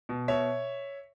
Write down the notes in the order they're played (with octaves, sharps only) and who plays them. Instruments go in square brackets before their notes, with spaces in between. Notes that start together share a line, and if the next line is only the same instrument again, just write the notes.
[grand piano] B2
B2 C#5 E5